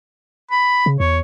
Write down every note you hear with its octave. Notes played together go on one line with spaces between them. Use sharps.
B5
C#3
E2 C#5